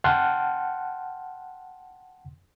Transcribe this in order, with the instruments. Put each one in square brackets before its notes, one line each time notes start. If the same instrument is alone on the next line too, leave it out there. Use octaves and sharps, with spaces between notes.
[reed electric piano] F#5 G5 A5 C6 F6 F#6